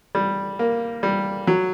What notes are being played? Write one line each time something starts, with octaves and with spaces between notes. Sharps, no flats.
G3
A#3
G3
F#3